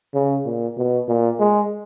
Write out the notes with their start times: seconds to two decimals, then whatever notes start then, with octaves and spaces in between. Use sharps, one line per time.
0.14 C#3
0.45 A#2
0.77 B2
1.08 A#2
1.39 G#3